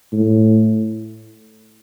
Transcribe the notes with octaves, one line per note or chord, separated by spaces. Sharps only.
A2